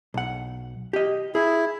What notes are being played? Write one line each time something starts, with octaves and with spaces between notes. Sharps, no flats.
B1 F#5
G4 D#5
E4 G#4